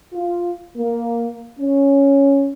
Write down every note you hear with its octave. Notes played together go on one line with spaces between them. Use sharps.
F4
A#3
C#4